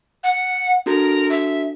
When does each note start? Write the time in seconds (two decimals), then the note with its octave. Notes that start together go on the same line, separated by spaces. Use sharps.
0.23 F#5
0.86 D4 F#4 A4 A#4
1.29 E5